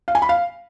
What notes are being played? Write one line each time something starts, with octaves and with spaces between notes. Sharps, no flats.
F5
G#5
B5
F5